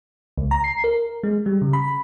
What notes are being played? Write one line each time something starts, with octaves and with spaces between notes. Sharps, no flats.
C#2
A#5
C7
A#4
G#3
G3
C#3
B5